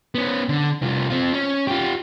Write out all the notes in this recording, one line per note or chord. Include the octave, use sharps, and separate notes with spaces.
B3 C#4
D3
C2 F4
C4 F4
C#4
F4 G4